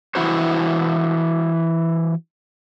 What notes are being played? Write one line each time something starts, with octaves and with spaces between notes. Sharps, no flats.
E3 E4 F#4 C5